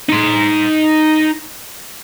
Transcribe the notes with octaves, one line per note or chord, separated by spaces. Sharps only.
D#4 C6